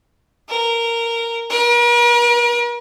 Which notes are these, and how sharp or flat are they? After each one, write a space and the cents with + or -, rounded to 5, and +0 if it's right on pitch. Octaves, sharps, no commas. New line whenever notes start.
A#4 -10
A#4 +45